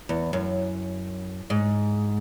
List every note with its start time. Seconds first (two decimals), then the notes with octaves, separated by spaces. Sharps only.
0.09 E2
0.33 F#2
1.50 G#2